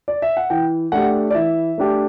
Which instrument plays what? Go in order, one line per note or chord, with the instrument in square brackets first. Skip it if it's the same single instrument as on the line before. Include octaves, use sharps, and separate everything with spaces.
[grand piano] D5
E5
F#5
[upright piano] E3 [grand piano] G5
[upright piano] A3 D4 G4 [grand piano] F#5
[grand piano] D5
[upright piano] E3 [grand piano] E5
[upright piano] A3 D4 G4